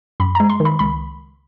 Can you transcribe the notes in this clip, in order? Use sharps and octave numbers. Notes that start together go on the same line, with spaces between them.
F#2 B5
G#3 A#5
C6
D#3
B5
C#2 B5